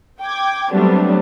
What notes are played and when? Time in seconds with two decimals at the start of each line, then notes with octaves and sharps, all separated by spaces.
0.21 G5 D6 G#6
0.71 F#3 G3 A3 B3 C4 D4